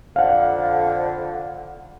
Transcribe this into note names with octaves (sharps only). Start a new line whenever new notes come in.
F2 D3 F5 F#5